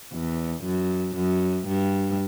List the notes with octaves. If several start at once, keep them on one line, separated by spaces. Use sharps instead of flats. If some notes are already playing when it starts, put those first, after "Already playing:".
E2
F#2
F#2
G2